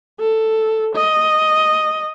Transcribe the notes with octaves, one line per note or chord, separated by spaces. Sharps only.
A4
D#5